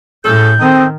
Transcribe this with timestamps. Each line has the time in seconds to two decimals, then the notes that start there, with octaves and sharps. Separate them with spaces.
0.25 A2 C#4 G#4 A4 G6
0.61 D#3 C4 A4 D#5